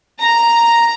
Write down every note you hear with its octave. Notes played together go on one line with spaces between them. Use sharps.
A#5